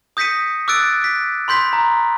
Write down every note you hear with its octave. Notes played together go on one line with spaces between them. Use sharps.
D#6 G6 A#6 B6 C#7 D#7
D6 E6 F#6 A6 D7
B6
B5 C6 G6 B6
A#5